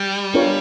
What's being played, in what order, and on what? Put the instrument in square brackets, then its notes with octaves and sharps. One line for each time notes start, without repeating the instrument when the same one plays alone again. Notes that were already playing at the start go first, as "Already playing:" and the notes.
Already playing: [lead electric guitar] G3
[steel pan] B3 D4 F4 A#4 C#5